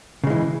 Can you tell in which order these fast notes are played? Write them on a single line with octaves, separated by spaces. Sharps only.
C#3 G#3 E3